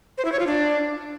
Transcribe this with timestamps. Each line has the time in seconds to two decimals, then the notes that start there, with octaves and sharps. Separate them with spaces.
0.18 C5
0.25 E4
0.32 C#5
0.40 F4
0.47 D4